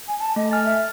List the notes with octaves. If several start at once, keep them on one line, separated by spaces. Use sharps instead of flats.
G#5
A5
A3 D#5
G#5 F6 A6
E5